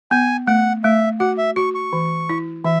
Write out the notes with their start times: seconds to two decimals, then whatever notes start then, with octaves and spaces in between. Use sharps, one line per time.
0.11 B3 G#5
0.47 A3 F#5
0.84 A3 E5
1.20 F#4 F#5
1.38 E5
1.56 F#4 C#6
1.75 C#6
1.93 E3
2.29 E4
2.65 E3 E5